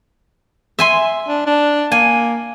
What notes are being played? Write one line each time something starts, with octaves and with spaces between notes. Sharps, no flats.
E5 G#5 C6
D4
D4
A#3 G#5